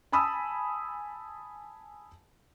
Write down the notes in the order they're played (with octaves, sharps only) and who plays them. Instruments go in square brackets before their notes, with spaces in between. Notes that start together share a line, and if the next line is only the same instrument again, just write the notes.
[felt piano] G#5 A5 B5 D#6 E6